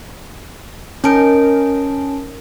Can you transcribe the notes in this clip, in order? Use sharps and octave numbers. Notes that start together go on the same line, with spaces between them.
C#4 D#4 A#4 A5 D7